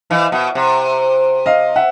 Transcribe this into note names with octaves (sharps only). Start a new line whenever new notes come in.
E3 D#5 F5
B2 E5 F#5
C3
D#5 F5
E5 F#5